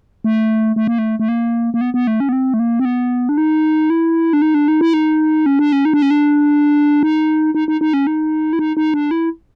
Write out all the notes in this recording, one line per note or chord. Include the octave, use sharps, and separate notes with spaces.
A3
A3
A#3
A3
A3
A#3
A#3
B3
B3
A3
C#4
B3
C4
A3
A#3
C4
B3
D4
D#4
E4
D4
D#4
D4
D#4
E4
D#4
C#4
D4
C#4
D#4
D4
C#4
D4
D#4
D#4
D#4
D#4
C#4
D#4
E4
D#4
D#4
D4
E4